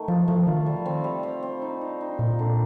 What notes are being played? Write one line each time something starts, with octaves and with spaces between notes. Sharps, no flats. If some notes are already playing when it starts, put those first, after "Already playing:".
Already playing: D#3 A3
F3 F4
F3 A3
D#3 F4
G3
C4
G3
C4
C4
D#4
D#4
D#4
A#2 D#4
D3